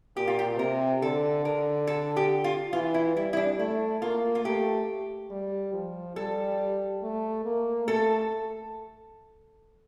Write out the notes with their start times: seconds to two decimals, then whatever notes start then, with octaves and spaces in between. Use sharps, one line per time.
0.17 A#2 G4
0.28 F4
0.39 G4
0.58 C3 A#4
1.02 D3 A4
1.44 D3 A#4
1.87 A4
2.17 G4
2.44 F4
2.73 E3 F4
2.94 E4
3.16 G3 E4
3.33 E4
3.37 D4
3.58 A3 E4
4.02 A#3 F4
4.35 F4
4.44 A3 G4
5.30 G3
5.73 F3
6.16 G3 A4
7.02 A3
7.45 A#3
7.87 A3 A4